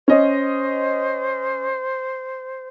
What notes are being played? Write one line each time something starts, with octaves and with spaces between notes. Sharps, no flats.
C#4 C5 D#5